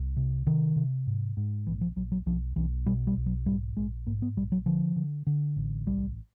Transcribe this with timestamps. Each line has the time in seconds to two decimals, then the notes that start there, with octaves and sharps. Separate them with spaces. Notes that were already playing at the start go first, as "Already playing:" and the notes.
Already playing: C2
0.17 C3
0.46 C3 D#3
0.76 C3
1.07 G#2
1.37 G#2
1.67 A#1 E3
1.81 F3
1.96 A#1 F#3
2.12 F#3
2.26 B1 F3
2.56 B1 E3
2.86 B2 G3
3.07 G3
3.17 B1
3.26 F#3
3.46 G#2 G3
3.77 A#1 G#3
4.07 G#2 A#3
4.22 B3
4.37 A#1 G3
4.52 F#3
4.66 D3 F3
4.96 D3
5.27 D3
5.56 A1
5.86 C2 G3